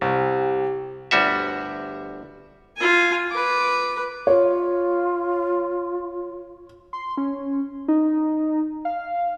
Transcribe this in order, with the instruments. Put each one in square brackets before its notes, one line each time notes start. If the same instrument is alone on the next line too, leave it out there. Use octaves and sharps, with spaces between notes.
[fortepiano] C2 [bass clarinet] G4
[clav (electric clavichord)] G1 D2 G3 F#4 E5
[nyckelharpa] F4 G#5
B4 D6
[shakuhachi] F4 [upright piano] C#5
[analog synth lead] C6
C#4
D#4
F5